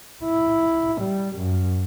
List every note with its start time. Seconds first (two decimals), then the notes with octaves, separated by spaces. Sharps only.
0.24 E4
1.02 G3
1.37 F#2